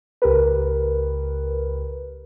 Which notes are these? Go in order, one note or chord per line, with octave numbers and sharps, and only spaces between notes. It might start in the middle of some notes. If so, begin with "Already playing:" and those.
C#2 G4 A#4 B4